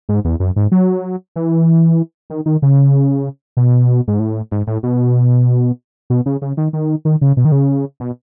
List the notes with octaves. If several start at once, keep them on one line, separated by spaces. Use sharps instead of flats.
G#2
E2
F#2
G#2
F#3
E3
D#3
D#3
C#3
B2
G#2
A2
G#2
A2
B2
B2
C#3
C#3
D#3
D#3
D#3
C#3
B2
D#3
C#3
B2